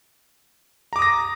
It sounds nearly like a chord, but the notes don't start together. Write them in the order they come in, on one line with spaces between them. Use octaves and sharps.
A#5 D6 D#6 A#6